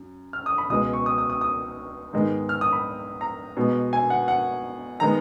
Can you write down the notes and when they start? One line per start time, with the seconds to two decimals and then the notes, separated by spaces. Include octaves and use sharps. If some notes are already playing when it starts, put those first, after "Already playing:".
Already playing: F#2
0.33 F6
0.46 D#6
0.58 B5
0.70 C#2 B2 G#3 B3 D#6
0.93 C#6
1.06 D#6
1.18 D#6
1.30 D#6
1.41 D#6
2.13 G#2 D#3 G#3 B3
2.49 F6
2.61 D#6
2.73 B5
3.21 A#5
3.57 B2 G#3 B3
3.93 G#5
4.10 F#5
4.28 F#5
5.00 D#3 G#3 B3 A#5